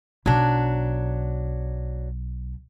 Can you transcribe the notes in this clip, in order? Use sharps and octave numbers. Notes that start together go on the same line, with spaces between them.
B1 F#3 D4